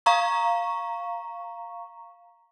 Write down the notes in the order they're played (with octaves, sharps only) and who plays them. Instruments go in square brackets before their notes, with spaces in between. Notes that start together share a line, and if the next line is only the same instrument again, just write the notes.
[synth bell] F5 A#5 C#6